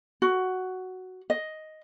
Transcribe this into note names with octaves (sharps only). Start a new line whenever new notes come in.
F#4
D#5